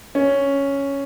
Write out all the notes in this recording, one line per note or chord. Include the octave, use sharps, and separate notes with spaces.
C#4